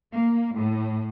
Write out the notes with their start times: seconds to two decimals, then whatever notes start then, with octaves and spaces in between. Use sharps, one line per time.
0.12 A#3
0.55 A2